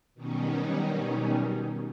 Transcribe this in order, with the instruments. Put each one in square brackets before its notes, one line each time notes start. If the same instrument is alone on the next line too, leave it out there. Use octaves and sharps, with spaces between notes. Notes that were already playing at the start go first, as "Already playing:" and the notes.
[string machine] B2 D#3 F#3 G3 C#4 D#4